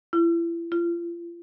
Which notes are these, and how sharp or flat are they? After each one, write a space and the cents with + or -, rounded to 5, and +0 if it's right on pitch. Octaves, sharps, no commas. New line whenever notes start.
E4 +35
F4 -35